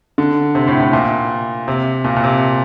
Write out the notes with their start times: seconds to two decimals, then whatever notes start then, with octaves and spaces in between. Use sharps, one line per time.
0.18 D3
0.55 C3
0.68 A2
0.80 A2
0.93 A#2
1.68 C3
2.04 A#2
2.16 A#2
2.24 C3